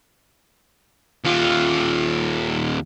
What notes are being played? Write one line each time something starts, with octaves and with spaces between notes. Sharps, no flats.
D#2 F4